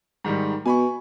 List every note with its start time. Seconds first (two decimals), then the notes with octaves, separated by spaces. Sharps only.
0.24 G#2 D#3 G3
0.66 B2 G#5 B5 C#6